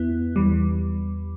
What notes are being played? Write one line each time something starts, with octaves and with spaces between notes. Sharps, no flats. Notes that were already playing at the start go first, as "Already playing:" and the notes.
Already playing: E2 B3 E4
E2 E3 G3